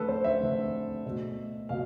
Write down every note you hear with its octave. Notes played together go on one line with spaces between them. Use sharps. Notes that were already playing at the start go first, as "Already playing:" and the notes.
Already playing: D3 A3 A4 B4
C5
E5
D3 A3
B2 A3
B2 F5